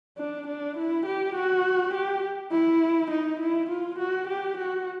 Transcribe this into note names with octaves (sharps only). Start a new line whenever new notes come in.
D4
D4
E4
G4
F#4
G4
E4
D#4
E4
F4
F#4
G4
F#4